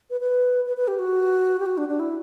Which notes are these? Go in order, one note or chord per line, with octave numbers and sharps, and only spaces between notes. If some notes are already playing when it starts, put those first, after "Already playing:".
B4
B4
B4
B4
G4
F#4
G4
F#4
D4
D4
E4